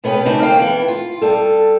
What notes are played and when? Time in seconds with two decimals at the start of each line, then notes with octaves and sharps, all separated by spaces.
0.04 B2 B3 C#4 G4 B4
0.25 C#3 D4 D#4 F#4
0.42 F2 A#3 F5 G5
0.59 E3 B3
0.88 F4
1.22 G3 A4